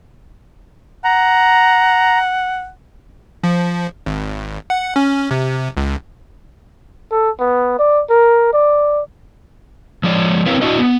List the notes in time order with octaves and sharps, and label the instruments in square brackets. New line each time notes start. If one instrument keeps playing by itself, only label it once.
[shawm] F#5 [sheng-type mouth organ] A#5
[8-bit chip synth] F3
G#1
F#5
C#4
C3
C#2
[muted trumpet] A4
B3
D5
A#4
D5
[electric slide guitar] F3 G#3 D5
C4 E4 A#4 B4 C#5 F5
D4 E4 F#4 D#5
B3